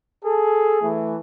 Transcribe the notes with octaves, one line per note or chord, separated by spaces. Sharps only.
G#4 A4
E3 A3